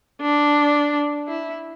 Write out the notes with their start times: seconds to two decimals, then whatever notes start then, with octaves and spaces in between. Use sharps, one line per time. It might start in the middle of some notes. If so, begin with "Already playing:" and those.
0.21 D4
1.27 E4